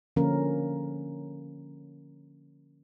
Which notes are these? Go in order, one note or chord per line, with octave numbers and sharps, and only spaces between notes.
D3 F3 A#3 C#4 A#4